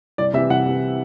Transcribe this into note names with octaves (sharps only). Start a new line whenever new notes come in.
C2 D5
C3 E3 E5
C2 F#5
C3 E3